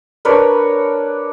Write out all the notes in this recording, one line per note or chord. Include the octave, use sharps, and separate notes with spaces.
D4 A#4 B4 C#5